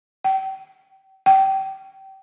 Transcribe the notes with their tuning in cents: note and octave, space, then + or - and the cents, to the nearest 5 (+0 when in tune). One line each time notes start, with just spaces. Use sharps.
G5 -35
G5 -25